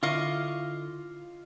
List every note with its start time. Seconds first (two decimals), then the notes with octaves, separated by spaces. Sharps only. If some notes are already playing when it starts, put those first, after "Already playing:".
0.03 D3 E4 F4 D#5 F5 C#6 D6